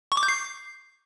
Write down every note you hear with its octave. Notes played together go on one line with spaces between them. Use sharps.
C#6
D6
G6
C7